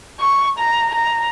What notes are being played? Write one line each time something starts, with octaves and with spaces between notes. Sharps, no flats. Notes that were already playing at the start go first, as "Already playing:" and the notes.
C#6
A#5
A#5